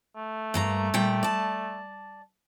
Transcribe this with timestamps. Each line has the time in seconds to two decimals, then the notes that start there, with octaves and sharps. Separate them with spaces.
0.16 A3
0.54 G2 A#3 A#5
0.94 A#2 G3 G5
1.23 D5 A5